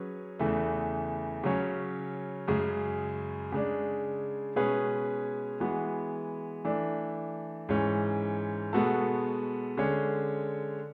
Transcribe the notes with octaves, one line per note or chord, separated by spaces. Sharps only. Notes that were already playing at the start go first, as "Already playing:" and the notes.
Already playing: F#3 C#4 G#4 B4
E2 C#3 E3 A3
C#3 F#3 C#4
F#2 C#3 G#3
C#3 G#3 D4
B2 G#3 C#4 G#4 B4
E3 G#3 B3 F#4
E3 A3 D4
G#2 E3 G#3 C#4
B2 G#3 B3 F#4 A4
D3 G#3 C#4